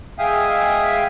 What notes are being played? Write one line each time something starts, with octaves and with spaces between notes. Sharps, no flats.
G#3 E5 F5 G5 G#5 D#6